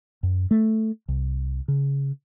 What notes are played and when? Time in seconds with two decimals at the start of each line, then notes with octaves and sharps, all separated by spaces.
0.23 F#2
0.51 A3
1.08 C2
1.68 C#3